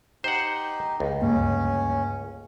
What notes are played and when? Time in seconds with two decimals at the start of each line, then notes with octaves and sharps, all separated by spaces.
0.24 D#4 G4 C5 F#5
1.00 C#2
1.22 D2 G2 A#3 C#4